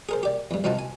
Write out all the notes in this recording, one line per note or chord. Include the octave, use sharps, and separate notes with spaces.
G#4 A#4 C5
G4 D5
E2 G2
C2 C4 D#4 F4 F#4 A5
G#5